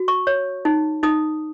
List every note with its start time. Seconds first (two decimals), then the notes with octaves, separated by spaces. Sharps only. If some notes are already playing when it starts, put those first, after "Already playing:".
Already playing: F#4
0.08 C#6
0.27 C#5
0.65 D#4
1.03 D#4 D#6